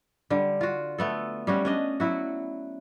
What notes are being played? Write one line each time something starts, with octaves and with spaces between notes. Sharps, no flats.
D3 G3
F4 F#4
A3 B3 A4
G3 C#4 F#4
C#4 D4 D#5
F#3 E4 F#4